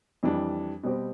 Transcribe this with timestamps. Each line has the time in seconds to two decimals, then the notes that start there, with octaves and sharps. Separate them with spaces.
0.23 F2 E3 G3 D4
0.83 B2 G3 C4 G4